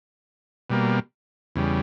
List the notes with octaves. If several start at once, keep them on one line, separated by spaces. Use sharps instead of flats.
B2 G3 A#3
E2 C#3 G3